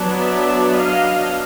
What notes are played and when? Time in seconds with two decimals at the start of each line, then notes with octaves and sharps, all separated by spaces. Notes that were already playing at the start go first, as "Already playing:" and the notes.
Already playing: F#3 B3 D4
0.17 D5 E5
0.75 D#5 F5